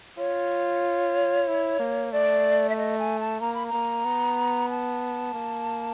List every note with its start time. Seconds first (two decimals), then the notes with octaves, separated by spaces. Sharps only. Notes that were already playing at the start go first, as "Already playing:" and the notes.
0.18 F4 C#5
1.48 E4
1.80 A#3
2.12 A3 D5
2.70 E5
2.77 D#5
2.99 G#5
3.20 A5
3.41 A#3 A#5
3.54 B5
3.67 A#5
3.73 A#3
4.05 B3
4.70 A5
5.34 A#3